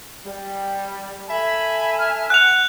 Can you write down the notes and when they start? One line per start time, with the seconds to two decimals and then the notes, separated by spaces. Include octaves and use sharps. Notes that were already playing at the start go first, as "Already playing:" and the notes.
0.25 G3
1.29 A4 E5 G#5 B5
1.99 F6
2.30 F#5 F#6 F7